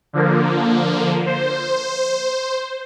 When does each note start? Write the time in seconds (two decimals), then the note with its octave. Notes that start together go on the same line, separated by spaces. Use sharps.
0.13 D3 F3 A#3
1.26 C5